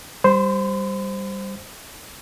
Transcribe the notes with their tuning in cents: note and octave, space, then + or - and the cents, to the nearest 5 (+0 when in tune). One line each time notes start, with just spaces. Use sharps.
G3 +0 C5 +0 B5 +45